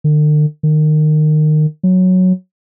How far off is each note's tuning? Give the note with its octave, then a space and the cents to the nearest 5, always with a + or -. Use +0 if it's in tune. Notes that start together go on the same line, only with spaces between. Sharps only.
D3 +45
D#3 -25
F#3 -5